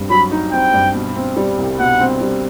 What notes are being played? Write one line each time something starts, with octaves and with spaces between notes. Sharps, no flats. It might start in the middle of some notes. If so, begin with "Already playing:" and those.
Already playing: G2 C4
F#3 B5
D#4
C4 G5
G2
B2
C4
G3
C2
B2 F#5
C4
G3